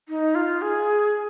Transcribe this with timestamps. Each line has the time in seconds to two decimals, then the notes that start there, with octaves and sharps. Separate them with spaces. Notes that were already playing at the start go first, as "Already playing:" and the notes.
0.09 D#4
0.35 F4
0.62 G#4